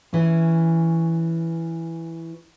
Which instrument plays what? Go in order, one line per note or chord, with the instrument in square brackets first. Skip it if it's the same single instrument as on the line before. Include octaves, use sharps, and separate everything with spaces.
[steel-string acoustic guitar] E3 C#4